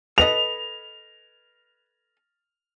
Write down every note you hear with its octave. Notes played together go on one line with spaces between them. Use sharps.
A4 B4 D#5 F7